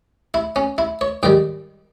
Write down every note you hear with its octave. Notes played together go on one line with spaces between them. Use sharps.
E4
C#4
E4
C#5
G#2 D#3 G3 G5